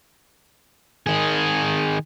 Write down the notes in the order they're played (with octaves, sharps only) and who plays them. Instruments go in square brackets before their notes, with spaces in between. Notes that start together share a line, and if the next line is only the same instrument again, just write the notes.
[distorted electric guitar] D#3 G#4